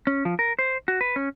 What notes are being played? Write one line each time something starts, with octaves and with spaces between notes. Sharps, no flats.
C#4
F3
A#4
C5
F#4
B4
C#4